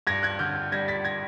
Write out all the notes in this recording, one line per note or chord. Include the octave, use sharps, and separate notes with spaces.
G2 G#6 A#6
F#6 G#6
D3 F6 G6
G3 G#6 A#6
A6 B6
G#6 A#6